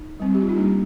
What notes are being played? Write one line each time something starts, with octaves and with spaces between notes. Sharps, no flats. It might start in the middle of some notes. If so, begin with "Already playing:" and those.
Already playing: D#4
G3 C4
G4
F4
D#4
G3 A#3 D4